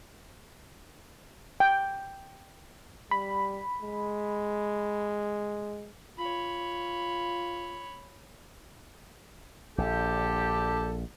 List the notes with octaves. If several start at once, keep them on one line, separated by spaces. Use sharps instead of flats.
G5
G3 B5
G#3
F4 C#5 B5
A#1 D3 G4 A4